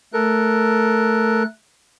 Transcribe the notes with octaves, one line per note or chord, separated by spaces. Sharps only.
A3 A4 A#4 F#6